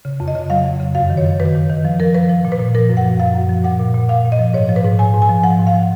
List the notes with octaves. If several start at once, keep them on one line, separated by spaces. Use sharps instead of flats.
C#3
F2
D#5
C#3
F#3 F5
F2
C#3
F#2 F5
D#3
C#5
F#2
D#3 B4
D#3
D#3
F3
F3 A#4
F3 B4
F3
A#2
B4
A#2
F3 A#4
F#2
F#5
F3
F#2 F5
F#2
F3
A#2 F#5
A#2
A#2
A#2 F5
A#2
D#5
F3
G#2 C#5
F3
B4
G#2
G#2 G#5
G#2
G#5
F3
F3 F#5
G#2
F5
F3